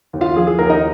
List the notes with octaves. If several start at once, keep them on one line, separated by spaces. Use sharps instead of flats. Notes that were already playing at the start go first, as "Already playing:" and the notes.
D#2
F4 F5
F3 G#4
G#4
D#2 A#4
D#4 D#5